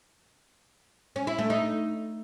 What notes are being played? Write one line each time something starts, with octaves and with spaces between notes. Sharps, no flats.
C#4
E4
A3
D#4